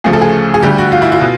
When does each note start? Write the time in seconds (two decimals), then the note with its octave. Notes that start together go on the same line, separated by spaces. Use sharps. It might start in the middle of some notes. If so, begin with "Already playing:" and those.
0.04 D2 C#3 F3 A3 G#4
0.13 A4
0.22 G#4
0.54 G#4
0.63 D2 D3 G3 G4
0.78 F#4
0.92 F4
1.02 E4
1.12 F4
1.21 B2